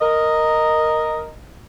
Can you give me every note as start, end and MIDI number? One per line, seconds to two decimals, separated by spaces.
0.01 1.29 70
0.01 1.29 75